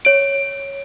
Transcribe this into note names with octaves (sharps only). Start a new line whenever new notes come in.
C#5 D7